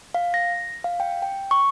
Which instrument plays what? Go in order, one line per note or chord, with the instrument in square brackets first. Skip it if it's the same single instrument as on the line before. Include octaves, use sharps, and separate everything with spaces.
[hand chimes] F5
A#6
F5
G5
G5
C#6